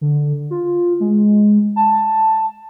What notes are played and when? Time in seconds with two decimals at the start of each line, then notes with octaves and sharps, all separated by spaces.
0.01 D3
0.51 F4
1.00 G#3
1.76 A5